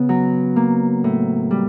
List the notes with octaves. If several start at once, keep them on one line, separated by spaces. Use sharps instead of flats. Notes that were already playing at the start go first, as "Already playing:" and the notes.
Already playing: C#3 B3
F#3
A#3
A2
G3